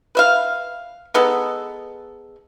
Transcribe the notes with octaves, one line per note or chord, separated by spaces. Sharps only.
B4 E5 F5
G#3 B3 D#4 A4